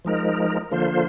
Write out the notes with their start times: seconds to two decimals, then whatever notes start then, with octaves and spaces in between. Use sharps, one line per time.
0.05 F3 G#3 D#4 A#4
0.72 D3 F3 A#3 F4 C5